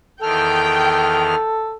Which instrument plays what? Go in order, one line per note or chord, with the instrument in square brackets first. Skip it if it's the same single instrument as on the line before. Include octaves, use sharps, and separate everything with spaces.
[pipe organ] E2 D#3 F6 [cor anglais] A4 [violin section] G5